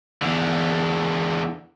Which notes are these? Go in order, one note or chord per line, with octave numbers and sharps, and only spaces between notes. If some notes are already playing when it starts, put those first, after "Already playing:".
E2 D3